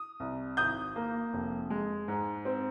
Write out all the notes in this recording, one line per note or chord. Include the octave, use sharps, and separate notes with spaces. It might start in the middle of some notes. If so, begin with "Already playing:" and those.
Already playing: D#6
C2
G#1 D#6 G6
A#3
F1
G#3
G#2
C4